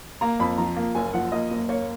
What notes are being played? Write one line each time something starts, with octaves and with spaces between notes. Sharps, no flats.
A#3 A#5
F2 B5
F3 A#5
A#3
F#1 G#5
F3 F#5
A#3 D#5
F#1
A#3 C#5